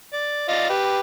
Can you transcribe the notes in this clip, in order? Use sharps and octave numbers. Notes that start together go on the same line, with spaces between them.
D5
F4 D5 D#5
G4 B4